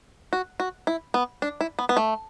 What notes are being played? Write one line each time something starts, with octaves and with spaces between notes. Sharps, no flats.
F#4
F#4
E4
B3
D4
E4
B3
B3
A3